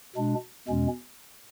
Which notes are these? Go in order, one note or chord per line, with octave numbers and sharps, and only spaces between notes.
B2 G#3 D4
E2 B2 G#3 C#4